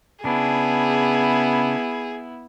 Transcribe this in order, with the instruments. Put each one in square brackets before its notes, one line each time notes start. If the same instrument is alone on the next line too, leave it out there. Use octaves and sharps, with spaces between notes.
[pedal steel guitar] C#3 D4 [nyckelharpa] B3 E4 [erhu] G#4